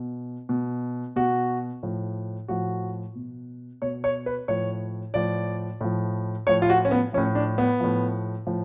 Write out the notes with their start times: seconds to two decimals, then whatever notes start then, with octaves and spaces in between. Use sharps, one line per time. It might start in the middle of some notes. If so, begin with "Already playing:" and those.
Already playing: B2
0.49 B2
1.16 B2 F#4
1.83 A2 F3
2.48 A2 F3 F#4
3.15 B2
3.82 B2 C#5
4.04 C#5
4.26 B4
4.48 A2 F3 C#5
5.14 A2 F3 D5
5.81 A2 F3
6.47 A2 F3 C#5
6.62 F4
6.70 F#4
6.85 C#4
6.91 B3
7.13 F3 C#4
7.17 A2
7.35 D4
7.58 B3
7.80 A2 F3
8.47 A2 F3